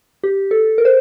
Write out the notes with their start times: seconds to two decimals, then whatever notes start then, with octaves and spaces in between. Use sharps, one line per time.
0.24 G4
0.51 A4
0.78 A#4
0.85 C5